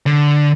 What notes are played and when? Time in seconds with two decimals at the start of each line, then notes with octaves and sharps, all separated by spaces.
0.06 D3